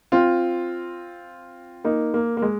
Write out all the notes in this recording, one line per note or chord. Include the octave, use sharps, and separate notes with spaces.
C4 F4
A#3 D#4
A#3
A#3
G#3